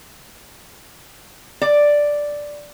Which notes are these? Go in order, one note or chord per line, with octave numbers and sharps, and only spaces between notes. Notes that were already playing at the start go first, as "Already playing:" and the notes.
D5